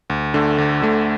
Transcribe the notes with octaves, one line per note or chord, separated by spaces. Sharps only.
D2
D3 A3
D2
D3 A3